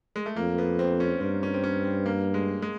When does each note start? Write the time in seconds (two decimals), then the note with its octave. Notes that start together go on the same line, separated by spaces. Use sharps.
0.16 G#3
0.26 A3
0.37 F2 A#3
0.58 B3
0.79 C4
1.00 C#4
1.21 G2 C4
1.43 C#4
1.54 C4
1.64 C#4
1.84 C4
2.06 A#3
2.34 G#3
2.62 G#3